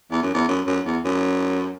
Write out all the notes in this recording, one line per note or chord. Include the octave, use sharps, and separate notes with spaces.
E2
F#2
E2
F#2
F#2
E2
F#2